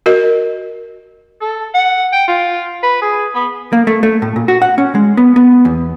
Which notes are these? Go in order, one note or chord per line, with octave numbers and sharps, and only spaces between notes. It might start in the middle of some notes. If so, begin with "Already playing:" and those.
F#4 A#4 D#5
A4
F#5
G5
F4
B4
G#4
B3
A#3
A3
A3
A2
A#2
F#4
F#5
C#4
G#3
B3
B3
E2